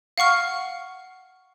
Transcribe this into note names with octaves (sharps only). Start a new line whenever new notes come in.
F5 F#5 C#6 F6